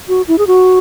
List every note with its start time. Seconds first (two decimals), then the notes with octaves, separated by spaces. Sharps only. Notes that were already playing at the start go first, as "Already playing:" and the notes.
0.09 F#4
0.28 E4
0.38 G#4
0.47 F#4